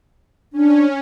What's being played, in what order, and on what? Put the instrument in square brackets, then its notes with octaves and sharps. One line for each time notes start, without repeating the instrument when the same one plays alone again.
[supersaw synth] C#4 [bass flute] D4